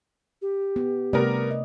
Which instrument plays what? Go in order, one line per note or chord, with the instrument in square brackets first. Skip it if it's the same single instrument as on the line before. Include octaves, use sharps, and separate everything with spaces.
[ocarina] G4
[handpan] B3
[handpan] C3 A3 D5 [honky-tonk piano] G3 B3 A#4
[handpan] D#5